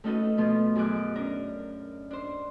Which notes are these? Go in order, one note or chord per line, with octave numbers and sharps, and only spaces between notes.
A3 C#4 D#4 F#4 A4 B4
B2 F3 A3 B3 C6
F#2 G#4 D#5 D6 F#6
C#4 D4 A#4
D4 C5